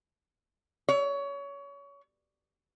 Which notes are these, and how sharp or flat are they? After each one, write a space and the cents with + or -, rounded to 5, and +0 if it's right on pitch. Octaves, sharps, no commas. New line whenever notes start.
C#5 +25